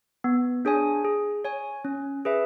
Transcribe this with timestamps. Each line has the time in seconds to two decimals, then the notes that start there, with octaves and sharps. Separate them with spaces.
0.24 B3
0.65 D4 G#4 C#5 G#5
1.05 G#4
1.45 C#5 G#5
1.85 C#4
2.25 G#4 B4 E5